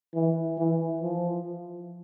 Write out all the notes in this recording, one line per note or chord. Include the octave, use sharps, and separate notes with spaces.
E3
E3
F3